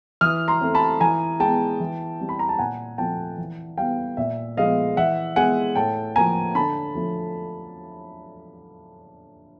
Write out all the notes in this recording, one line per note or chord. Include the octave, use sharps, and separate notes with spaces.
E3 D#6 F6
A#5 C6
A3 C4
A5 B5
E3 G#5 A#5
G#3 B3 G5 A5
E3
G3 C4
B5
A#5
A5
A#2 F#5 G#5
F3 A3 C4 G5 A5
E3
G3 B3 F5 G5
A#2 E5
F3 G#3 B3 D#5 F5
E3 E5 F#5
G#3 B3 F#5 G#5
A2 G5 A5
F3 A#3 G#5 A#5
D3 A5 B5
F3 A3